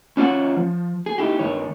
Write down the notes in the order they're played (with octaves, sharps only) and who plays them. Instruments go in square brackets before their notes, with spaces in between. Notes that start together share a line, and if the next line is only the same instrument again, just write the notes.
[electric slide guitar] C#4 D4 F4 C#5 F#5
F3
G#4
D#4 E4 G4
G2 D#3 C#5